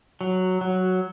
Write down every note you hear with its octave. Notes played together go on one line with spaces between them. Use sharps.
F#3
F#3